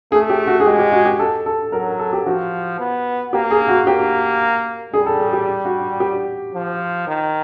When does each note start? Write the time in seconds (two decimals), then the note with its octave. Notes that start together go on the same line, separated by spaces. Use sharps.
0.12 A3 G#4
0.30 G4
0.47 F#4
0.60 G#4
0.65 G#3 G4
0.79 G4
0.92 F#4
1.05 G4
1.19 A4
1.46 A4
1.72 F#3 A#4
1.99 A4
2.13 G4
2.26 F3 F#4
2.79 B3
3.33 A#3 G4
3.51 G#4
3.68 F#4
3.87 A#3 G4
4.93 G3 G#4
5.06 A4
5.20 G#4
5.33 G4
5.65 F#4
6.00 G4
6.54 F3
7.07 D#3